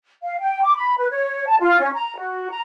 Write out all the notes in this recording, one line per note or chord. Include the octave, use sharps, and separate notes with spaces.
F5
G5
D6
B5
B4
C#5
A5
F4
C#4
A#5
F#4
A#5